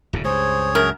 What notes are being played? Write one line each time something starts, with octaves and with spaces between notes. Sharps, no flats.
D1 G#2 C#3
C#2 G2 G#4 C5 C#5
F#2 A#4